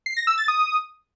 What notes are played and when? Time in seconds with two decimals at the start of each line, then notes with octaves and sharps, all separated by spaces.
0.06 C7
0.17 A#6
0.27 E6
0.38 A6
0.48 D#6